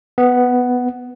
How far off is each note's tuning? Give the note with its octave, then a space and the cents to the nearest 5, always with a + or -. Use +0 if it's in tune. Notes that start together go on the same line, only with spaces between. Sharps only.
B3 +5